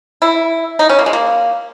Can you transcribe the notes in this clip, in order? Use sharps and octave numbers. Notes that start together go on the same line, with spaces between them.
E4
D#4
C#4
A#3
G#3
A#3